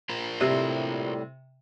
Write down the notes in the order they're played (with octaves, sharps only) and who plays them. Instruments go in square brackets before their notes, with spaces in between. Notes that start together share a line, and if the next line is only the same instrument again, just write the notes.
[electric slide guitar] F4 A#4 C5
[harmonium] A2 G3 [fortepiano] C3